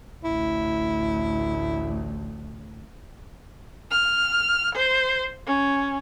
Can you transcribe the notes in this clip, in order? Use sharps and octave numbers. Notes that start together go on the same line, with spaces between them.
A1 D2 E4
F6
C5
C#4